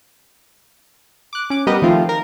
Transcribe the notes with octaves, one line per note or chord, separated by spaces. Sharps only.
D6 F#6
C#4 D6
G3 B3 G4 A#4 B4 D#5
D#3 F3 A3 C4 F4
A#4